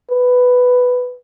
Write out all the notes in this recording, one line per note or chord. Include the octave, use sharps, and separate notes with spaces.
B4